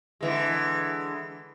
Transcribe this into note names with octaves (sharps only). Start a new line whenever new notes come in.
D3 E3 G#3